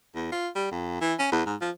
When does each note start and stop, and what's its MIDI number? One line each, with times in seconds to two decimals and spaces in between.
0.15 0.29 40
0.32 0.48 65
0.55 0.70 55
0.72 0.99 41
1.01 1.14 52
1.19 1.32 61
1.32 1.43 40
1.46 1.55 44
1.61 1.70 53